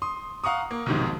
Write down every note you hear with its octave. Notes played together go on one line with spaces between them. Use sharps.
C6 D#6
F5 F#5 A#5 C#6 D#6
A#3
B1 F2 G#2 C3 D#3